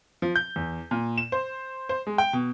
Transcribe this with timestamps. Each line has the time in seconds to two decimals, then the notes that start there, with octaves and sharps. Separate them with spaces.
0.22 F3
0.36 G6
0.56 E2
0.91 A#2
1.18 E7
1.32 C5
1.89 C5
2.07 G#3
2.18 G5
2.33 B2